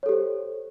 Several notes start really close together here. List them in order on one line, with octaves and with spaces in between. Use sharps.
C#5 A4 G4 C5